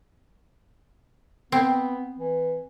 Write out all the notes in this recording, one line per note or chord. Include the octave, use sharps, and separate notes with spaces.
B3 C4
E3